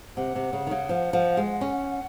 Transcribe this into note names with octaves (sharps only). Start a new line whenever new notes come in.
C3 F#5
C3
C#3
D#3
C#3
F3
F3
G#3
C#4